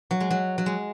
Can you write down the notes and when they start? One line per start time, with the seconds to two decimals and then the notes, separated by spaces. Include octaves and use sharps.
0.11 F#3
0.20 G#3
0.30 F#3
0.58 F#3
0.66 G#3